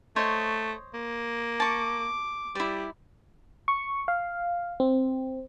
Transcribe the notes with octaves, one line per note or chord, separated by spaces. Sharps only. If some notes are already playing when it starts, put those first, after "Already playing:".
A3 C5 C#5 D#5
A#3
A5 C#6 D6
G3 E4 D5
C#6
F5
C4